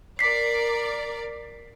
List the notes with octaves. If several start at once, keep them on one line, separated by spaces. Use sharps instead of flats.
A#4 D5 B6 C7